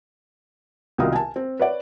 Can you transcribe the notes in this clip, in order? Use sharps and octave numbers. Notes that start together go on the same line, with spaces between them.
C2 B2 D#3 F4 A#4 D#6
G#5 A5
C4
B4 C#5 D5